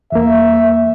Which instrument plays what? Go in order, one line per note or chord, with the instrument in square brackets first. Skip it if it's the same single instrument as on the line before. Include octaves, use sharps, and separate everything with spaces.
[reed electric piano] E2 A#3 [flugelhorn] E5